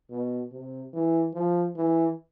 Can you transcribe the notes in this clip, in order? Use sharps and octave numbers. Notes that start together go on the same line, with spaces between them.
B2
C3
E3
F3
E3